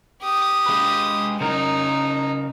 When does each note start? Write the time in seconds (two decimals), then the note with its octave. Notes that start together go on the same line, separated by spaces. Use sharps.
0.22 G4 D#6
0.66 G#3 B4
1.41 C#3 D#4 A#4